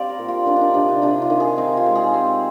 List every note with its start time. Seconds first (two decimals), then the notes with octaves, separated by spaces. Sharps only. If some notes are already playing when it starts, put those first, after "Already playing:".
Already playing: G3 C4 D5 F5 G5
0.09 A#4
0.19 A#2
0.28 F4
0.46 D#3 D4
0.56 D4 D#4
0.74 C3 D4
0.89 D#4
1.02 C3 D4
1.22 F4
1.30 D#3
1.40 G#4
1.58 C4 D#4
1.77 F4
1.86 G#3
1.95 G#4
2.14 C4